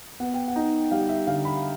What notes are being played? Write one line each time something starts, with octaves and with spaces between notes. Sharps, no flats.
B3 F#5
G5
F#5
D#4
G3 F5
E5
D3 F5
B5